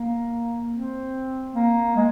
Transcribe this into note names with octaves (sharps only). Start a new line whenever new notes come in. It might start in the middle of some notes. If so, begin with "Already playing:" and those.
Already playing: A#3
C4
A#3
G#3